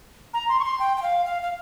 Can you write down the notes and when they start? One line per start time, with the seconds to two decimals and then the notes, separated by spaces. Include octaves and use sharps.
0.34 A#5
0.49 C6
0.59 C#6
0.64 C6
0.79 G5
0.97 G5
1.02 F5
1.26 F5
1.42 F5